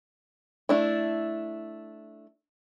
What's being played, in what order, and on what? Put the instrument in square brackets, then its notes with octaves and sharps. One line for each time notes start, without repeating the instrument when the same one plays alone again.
[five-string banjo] A3 D4 E4